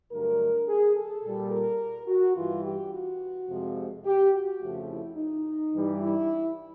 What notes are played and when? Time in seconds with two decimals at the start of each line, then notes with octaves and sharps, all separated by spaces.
0.11 G2 D3 F#3 A3 A#4
0.68 G#4
0.96 A4
1.24 A#2 G3
1.52 A#4
2.08 F#4
2.36 G2 E3 G3 F4
2.65 G4
2.93 F#4
3.49 F2 C3 F3 G#3
4.05 G4
4.33 F#4
4.61 F2 C#3 F3 A3
4.90 E4
5.17 D#4
5.74 G2 E3 G3
6.02 E4